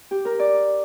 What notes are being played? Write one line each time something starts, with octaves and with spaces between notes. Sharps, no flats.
G4
A#4
D5